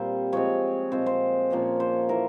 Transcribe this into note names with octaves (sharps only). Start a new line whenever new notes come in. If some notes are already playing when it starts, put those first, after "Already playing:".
Already playing: A#2 G3 C4 C5
F3 G#3 C4 C#5
A#2 F3 G#3 C4 C5
C5
A#2 F3 A#3 C#4
C5
E3 A#3 A#4